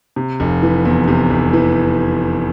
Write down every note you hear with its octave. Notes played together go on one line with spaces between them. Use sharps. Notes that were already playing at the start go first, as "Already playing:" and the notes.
C3
F1
E3
E2
C3
F1
E3